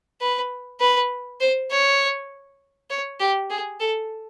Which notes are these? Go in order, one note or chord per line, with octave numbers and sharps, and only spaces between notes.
B4
B4
C5
C#5
C#5
G4
G#4
A4